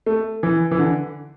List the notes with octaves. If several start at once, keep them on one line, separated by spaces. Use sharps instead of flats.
A3
E3
E3
D3